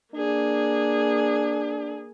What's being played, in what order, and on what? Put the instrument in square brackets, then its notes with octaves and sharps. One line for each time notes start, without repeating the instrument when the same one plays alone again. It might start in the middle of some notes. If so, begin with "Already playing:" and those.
[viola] A#3 G#4 [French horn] D4